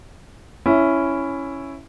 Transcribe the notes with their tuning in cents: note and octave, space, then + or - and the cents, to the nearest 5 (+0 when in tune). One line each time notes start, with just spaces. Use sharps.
C#4 +0 E4 +5